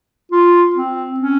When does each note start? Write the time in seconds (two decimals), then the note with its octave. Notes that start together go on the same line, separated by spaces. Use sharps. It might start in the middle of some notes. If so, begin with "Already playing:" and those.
0.32 F4
0.75 C4
1.20 C#4